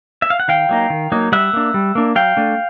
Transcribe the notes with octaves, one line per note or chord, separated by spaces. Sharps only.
E5
F5
F#5
D#3 F5 G5
F#3 A#3 D#4
D#3
F#3 A#3 D#4
G3 E5 F#5
A#3 D4
G3
A#3 D4
F#3 F5 G5
A3 D4